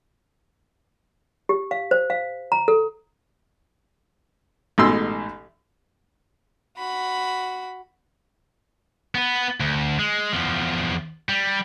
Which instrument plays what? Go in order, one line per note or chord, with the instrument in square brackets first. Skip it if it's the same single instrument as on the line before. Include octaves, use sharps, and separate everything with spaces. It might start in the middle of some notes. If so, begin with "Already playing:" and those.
[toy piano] G4
F5
C5
F5
A#5
A4
[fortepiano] A1 G#2 B2 C6 E6
[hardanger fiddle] F#4 B5
[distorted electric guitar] B3 B4
D2
G#3
E2 F3
G3